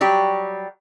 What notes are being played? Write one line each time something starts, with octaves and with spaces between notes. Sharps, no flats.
F#3 G3 G4